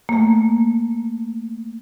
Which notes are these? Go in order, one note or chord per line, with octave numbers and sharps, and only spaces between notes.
A3 A#3